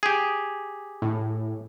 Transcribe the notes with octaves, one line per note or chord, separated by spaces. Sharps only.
G4 G#4
A2